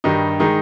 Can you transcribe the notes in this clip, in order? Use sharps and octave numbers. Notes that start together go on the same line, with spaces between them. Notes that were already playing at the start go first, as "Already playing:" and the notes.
G2 D#3 G3 D#4
D#3 G#3 D#4